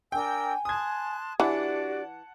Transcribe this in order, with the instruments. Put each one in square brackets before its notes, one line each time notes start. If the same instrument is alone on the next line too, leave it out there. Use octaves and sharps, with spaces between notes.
[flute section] D4 A#4 E6 [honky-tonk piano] G5 [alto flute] G#5
[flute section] A5 C6 F#6 [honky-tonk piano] D#6 G#6
[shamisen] E3 [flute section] D4 F#4 D5 [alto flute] G4 [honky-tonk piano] F#5 A5